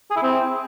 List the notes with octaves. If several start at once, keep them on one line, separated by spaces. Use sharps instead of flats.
G#4
E4
C4